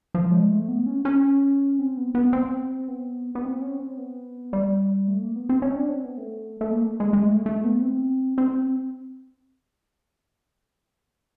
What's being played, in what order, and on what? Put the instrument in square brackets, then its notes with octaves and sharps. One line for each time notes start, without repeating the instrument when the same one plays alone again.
[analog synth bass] F3
G#3
A3
B3
C#4
C#4
C4
B3
B3
C4
B3
B3
C4
C#4
C4
B3
G3
A3
A#3
B3
C4
C#4
D4
C4
B3
A3
A3
A#3
G#3
G#3
A3
A3
B3
C4
C4